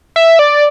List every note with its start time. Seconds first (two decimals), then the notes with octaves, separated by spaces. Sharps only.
0.16 E5
0.39 D5